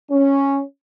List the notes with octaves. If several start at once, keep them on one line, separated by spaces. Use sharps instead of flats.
C#4